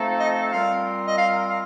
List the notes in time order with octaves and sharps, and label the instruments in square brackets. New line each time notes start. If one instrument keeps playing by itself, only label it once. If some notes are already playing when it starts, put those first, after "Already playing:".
Already playing: [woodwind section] F3 A3 C4 D#4 A4
[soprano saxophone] D#5
[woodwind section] A#2 G3 C4 F4 A#4 [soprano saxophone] F5
[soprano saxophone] D#5
F5
F5